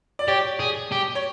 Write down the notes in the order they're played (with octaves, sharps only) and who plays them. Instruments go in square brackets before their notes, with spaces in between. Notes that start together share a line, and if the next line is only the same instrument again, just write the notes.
[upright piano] D5
[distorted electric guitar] G4 [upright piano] C#5
[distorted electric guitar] G#4
G4
[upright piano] C#5